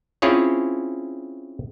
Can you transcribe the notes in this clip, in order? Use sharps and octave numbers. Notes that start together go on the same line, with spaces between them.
C4 C#4 E4 F4 G#4 C#5